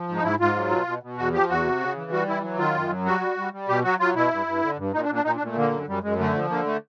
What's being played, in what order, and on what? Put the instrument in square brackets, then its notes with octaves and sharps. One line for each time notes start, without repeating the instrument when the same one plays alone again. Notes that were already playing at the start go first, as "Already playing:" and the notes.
Already playing: [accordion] F3
G#2
D#4
G#2 E4
G#2 F4
F#3
B2
B2
B2
E2 F#4
F3 G4
E2 F#4
C3
C#3
E3
G3 F#4
E3 E4
F#3
D#3 F4
F#2
F#3
G3 F#4
G3
G3
G3
B2 G4
F#3 F#4
F#3 F4
B2 E4
G2
G2
D3
G2
A#2 D#4
D4
A#2
D4
A#2 D#4
D4
A#2
A3
D3 A#3
F#2
F#2 G3
F#2 G#3
D3 A3
F3
D3 A#3
A3